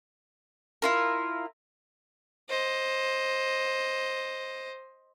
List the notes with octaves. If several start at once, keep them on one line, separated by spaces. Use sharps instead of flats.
E4 F4 A#4
C5 D#5